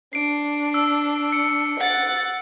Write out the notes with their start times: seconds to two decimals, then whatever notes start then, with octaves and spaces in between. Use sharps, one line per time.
0.13 D4 C7 D7
0.74 E6
1.32 C#7
1.79 F#5 A6